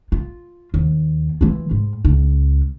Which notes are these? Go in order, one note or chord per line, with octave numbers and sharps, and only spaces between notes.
F4
D#2
E3 F4
G#2
C#2